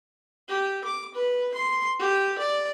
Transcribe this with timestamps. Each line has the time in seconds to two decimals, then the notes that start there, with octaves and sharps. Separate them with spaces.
0.49 G4
0.84 D6
1.14 B4
1.54 C6
1.99 G4
2.38 D5